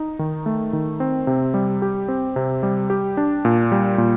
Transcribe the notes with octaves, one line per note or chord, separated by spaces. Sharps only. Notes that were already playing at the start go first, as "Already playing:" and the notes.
Already playing: D#4
D#3
A3
D#3
C4
C3
G3
G4
C4
C3
G3
G4
D4
A#2
G3
A#2